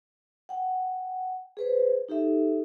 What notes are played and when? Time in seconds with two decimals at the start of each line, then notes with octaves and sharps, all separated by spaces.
0.49 F#5 G5
1.57 G#4 B4 C5
2.09 D#4 G4 A4 E5